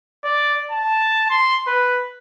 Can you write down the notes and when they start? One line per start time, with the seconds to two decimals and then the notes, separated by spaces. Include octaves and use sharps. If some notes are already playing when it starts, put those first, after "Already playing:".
0.24 D5
0.71 A5
1.30 C6
1.67 B4